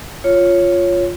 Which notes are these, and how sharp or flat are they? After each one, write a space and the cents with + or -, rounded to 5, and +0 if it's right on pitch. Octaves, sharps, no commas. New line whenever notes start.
F4 +0 C#5 +0